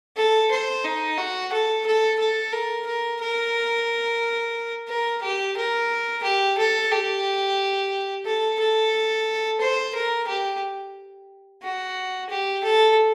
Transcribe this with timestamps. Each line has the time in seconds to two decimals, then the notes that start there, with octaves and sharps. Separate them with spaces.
0.17 A4
0.51 C5
0.84 D#4
1.18 F#4
1.52 A4
1.86 A4
2.19 A4
2.52 A#4
2.86 A#4
3.21 A#4
4.88 A#4
5.23 G4
5.57 A#4
6.23 G4
6.58 A4
6.91 G4
8.25 A4
8.59 A4
9.61 C5
9.95 A#4
10.28 G4
11.62 F#4
12.29 G4
12.63 A4